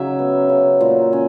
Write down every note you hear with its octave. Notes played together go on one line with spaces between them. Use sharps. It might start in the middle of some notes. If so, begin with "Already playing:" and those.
Already playing: C#3 F#3 D#4 E5
B3
C#3
A#2
C#4